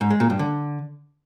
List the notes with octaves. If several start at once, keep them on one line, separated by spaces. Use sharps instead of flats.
G#2
G#3
A#2
G2
D3